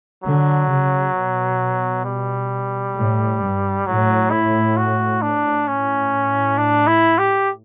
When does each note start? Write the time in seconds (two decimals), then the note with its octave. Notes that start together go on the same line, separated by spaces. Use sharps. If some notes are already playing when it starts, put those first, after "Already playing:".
0.24 D3 F#3
0.70 C#3
1.15 B2
2.05 G3
2.96 A2
3.40 G2
3.87 A2 F#3
4.31 E4
4.77 F#4
5.22 D4
5.67 A2 C#4
6.58 D4
6.87 E4
7.18 G4